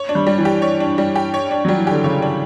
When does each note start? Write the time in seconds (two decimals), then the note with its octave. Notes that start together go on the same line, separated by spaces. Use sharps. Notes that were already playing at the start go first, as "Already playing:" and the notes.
Already playing: C#5
0.09 D4
0.15 G3
0.27 G3
0.38 E3
0.45 G4
0.62 C#5
0.80 D4
0.98 G3
1.16 G4
1.34 C#5
1.51 D4
1.65 F#3 G3
1.78 E3
1.87 D3 G4
2.04 C#3 C#5
2.22 D4